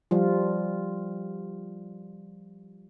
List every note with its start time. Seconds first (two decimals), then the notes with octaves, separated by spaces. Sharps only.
0.11 F3 G3 F4